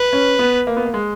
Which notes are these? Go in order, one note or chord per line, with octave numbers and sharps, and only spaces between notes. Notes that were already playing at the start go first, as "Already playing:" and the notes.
Already playing: B4
C#4
B3
A#3
B3
A#3
G#3